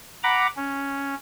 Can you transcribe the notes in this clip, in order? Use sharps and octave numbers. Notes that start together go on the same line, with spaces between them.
F#5 A#5 B5 D6
C#4